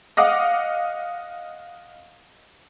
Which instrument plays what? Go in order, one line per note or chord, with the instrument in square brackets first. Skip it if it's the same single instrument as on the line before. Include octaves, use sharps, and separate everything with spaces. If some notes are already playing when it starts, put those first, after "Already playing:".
[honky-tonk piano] D#5 F5 F#5 D6